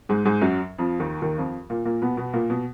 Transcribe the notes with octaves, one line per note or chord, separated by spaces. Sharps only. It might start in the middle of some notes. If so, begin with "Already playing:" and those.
G#2 G#3
G#2 G#3
F#2 F#3
F2 F3
D#2 D#3
D#2 D#3
F2 F3
A#2 A#3
A#2 A#3
B2 B3
B2 B3
A#2 A#3
B2